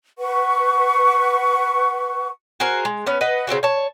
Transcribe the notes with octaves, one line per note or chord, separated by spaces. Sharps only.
B4 F#5 C#6
F#4 G#4 A#4 C5
G#3
B3 C#4 B4
B4 D#5 F#5
C#3 C4 F4 F#4
C#5 A5